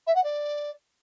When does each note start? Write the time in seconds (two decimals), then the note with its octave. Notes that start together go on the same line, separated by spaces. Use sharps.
0.07 E5
0.15 F#5
0.24 D5